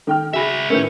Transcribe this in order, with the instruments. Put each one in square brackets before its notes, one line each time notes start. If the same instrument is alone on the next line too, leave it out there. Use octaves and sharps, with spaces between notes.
[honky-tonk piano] D#3 G5 F6 [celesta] A4
[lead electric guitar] C#2 E5 [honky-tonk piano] F#4 A#6 [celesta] G#4 G#5 B5
[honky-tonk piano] A2 D#3 A3 [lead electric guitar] C#4 [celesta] A#4 B4 G6